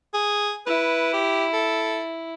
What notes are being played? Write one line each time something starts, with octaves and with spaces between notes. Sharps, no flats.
G#4
E4 B4
G4
A4